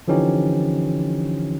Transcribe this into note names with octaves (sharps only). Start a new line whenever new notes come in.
D3 E3 F3 C#4 D#4 G4